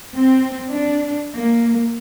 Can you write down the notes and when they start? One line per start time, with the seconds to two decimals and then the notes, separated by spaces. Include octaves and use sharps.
0.15 C4
0.72 D4
1.35 A#3